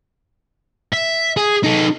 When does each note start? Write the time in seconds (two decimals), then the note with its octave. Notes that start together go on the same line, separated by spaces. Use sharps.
0.93 E5
1.37 G#4
1.64 D#4 A4